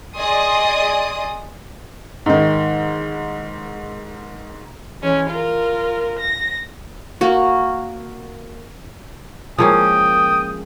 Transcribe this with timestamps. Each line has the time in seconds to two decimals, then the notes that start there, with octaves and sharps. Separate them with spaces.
0.16 G#4 D5 D#5 C6 D#6
2.26 G#2 D#3
5.01 E3 G#3 C#4
5.30 F4 A#4
6.19 A#6
7.21 A#3 F#4
9.58 F3 G#3 A#3 C#4 G#4 A#4 G5 D#6